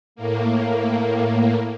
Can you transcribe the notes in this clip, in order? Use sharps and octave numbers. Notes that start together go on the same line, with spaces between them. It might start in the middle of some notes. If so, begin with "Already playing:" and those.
A2 A#3